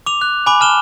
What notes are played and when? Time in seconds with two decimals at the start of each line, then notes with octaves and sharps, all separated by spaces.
0.06 D6 F7
0.21 F#6
0.46 G#5 B5 D6
0.60 A5 F6 E7 G7